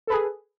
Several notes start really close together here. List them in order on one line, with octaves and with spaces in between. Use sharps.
A4 B4 G#4